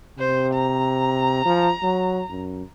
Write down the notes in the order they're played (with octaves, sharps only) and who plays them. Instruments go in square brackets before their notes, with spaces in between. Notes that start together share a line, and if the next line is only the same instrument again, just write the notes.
[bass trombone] C3 [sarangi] C5
[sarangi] A#5
[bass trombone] F3
F#3
F#2